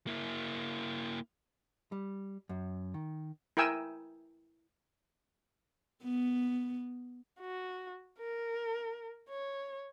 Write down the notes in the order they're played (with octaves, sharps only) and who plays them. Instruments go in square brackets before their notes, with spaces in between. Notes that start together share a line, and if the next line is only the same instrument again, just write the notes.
[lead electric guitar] A#3 E4
[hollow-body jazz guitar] G3
F#2
D#3
[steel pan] E4 A#4 G5 G#5 E6
[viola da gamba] B3
[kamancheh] F#4
A#4
C#5